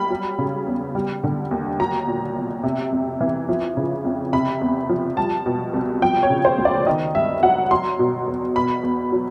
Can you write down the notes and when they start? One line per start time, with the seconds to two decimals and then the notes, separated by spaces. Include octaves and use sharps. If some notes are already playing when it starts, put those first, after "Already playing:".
Already playing: G3 B5
0.10 F#3
0.38 C#3
0.67 E2
0.95 G3
1.24 D3
1.51 D#2
1.80 F#3 A#5
2.07 A#2
2.36 B1
2.63 C3
2.92 F2
3.21 E3
3.49 F3
3.77 C#3
4.05 F2
4.33 C3 B5
4.61 E2
4.89 F3
5.17 G3 A5
5.46 B2
5.74 C2
6.02 F3 G5
6.23 C#5
6.30 C#3
6.45 C5
6.58 D2
6.65 D5
6.86 D#3 D#5
7.15 G2 E5
7.43 F#3 F#5
7.71 F#3 C6
7.99 B2
8.28 E2
8.56 B2 B5
8.83 E2
9.12 F#3